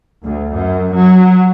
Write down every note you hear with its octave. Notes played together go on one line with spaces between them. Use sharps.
D2
F#2
F#3